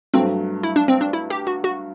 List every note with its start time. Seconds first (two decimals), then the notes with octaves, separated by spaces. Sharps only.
0.14 G2 F#3 A3 C4
0.63 E4
0.76 D4
0.88 C4
1.01 D4
1.13 E4
1.30 G4
1.47 F#4
1.64 F#4